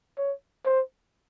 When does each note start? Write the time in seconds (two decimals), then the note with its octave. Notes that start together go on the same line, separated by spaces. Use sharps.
0.18 C#5
0.66 C5